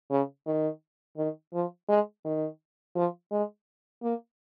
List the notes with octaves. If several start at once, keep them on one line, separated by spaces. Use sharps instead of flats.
C#3
D#3
D#3
F3
G#3
D#3
F3
G#3
A#3